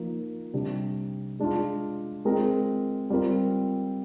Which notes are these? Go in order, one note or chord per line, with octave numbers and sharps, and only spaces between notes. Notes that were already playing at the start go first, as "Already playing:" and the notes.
Already playing: F3 A#3 D#4
C3 G3 D4
G#3 D4 F4
G#3 C4 F4 A#4
G3 C4 F4 A#4